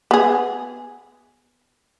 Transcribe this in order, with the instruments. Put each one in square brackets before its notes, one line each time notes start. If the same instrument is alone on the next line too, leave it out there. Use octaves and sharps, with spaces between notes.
[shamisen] B3 G#4